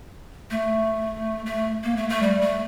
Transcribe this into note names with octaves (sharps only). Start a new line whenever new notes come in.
A3
A3
A#3
A3
A3
G3
A3